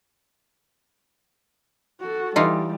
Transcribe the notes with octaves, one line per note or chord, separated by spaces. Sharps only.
F#4 A4
E3 G3 D#4 F4